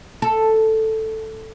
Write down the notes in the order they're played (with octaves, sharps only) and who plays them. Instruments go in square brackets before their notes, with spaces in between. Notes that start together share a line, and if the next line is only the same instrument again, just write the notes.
[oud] A4